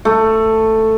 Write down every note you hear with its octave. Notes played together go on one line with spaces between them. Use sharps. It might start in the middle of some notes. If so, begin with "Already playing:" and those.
A3